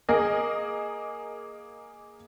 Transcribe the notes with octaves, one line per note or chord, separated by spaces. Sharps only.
A#3 G#4 A#4 D#5